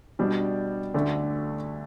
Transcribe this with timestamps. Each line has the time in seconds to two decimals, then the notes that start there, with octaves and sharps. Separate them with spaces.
0.19 B2 G3 D4
0.94 D2 D3 A3